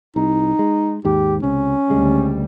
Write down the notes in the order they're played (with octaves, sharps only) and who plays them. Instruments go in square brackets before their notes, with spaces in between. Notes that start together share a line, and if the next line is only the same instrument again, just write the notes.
[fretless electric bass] C2 [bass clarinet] D#4
[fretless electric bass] G#3
[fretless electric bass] D#2 G#2 [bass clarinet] G4
[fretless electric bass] C#2 C3 [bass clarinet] C#4
[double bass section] D2 G3 [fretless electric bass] C#3 G#3